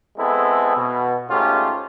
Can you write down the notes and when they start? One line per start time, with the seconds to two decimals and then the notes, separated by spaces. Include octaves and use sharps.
0.18 G#3 B3 C4 E4 A4
0.77 B2
1.30 G#2 A3 C#4 F4 G4